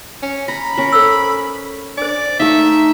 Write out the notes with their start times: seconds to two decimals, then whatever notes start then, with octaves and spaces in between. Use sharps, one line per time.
0.22 C#4
0.48 A#5 B5
0.77 C#4 A#4
0.92 A4 C5 E6
1.97 D4 C5 D5
2.40 A3 D#4 E5 F5